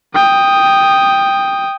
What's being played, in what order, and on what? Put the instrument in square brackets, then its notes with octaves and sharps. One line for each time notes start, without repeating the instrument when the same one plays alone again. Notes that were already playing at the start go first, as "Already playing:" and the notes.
[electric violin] G5 D#6